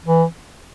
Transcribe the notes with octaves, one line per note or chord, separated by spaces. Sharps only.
E3